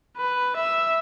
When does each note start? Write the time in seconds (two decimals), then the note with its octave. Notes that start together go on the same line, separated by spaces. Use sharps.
0.17 B4
0.57 E5